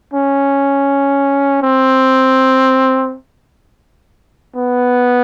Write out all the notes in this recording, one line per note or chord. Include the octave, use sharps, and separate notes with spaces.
C#4
C4
B3